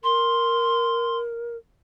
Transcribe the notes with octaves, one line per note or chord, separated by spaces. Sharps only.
A#4 C6